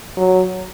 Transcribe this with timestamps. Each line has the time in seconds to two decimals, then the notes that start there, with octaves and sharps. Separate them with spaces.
0.17 F#3